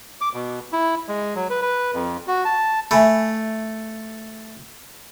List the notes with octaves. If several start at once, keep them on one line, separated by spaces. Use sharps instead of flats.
D6
B2
E4
G#3
F#3
B4
B4
F2
F#4
A5
A3 E5 G#5 B5